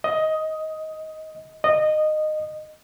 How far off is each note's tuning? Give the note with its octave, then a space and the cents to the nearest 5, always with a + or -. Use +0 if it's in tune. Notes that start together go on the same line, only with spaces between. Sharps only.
D#5 +10
D#5 -20